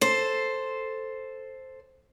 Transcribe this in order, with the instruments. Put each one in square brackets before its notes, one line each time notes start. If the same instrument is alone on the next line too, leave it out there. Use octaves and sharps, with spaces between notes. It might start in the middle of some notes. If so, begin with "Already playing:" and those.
[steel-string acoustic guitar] A4 C5